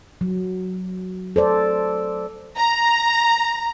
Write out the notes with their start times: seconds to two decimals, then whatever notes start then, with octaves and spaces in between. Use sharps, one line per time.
0.21 F#3
1.36 A4 C5 D5
2.57 A#5